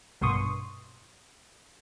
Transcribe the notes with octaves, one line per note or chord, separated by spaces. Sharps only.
A#1 G2 B2 C6 C#6 D#6